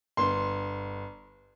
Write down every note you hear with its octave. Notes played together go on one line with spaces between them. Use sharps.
G1 C6